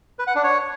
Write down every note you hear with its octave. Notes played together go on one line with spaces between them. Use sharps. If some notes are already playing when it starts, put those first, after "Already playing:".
B4
F#5
D4
C#5